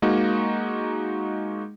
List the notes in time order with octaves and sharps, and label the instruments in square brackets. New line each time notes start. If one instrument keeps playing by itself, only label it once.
[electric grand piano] G#3 A#3 D#4 F#4